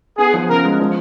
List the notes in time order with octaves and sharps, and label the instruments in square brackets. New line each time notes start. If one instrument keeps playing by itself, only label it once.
[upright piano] B3 [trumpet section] G#4
[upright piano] F3
[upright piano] C#3 [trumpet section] A#4
[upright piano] G#3
F3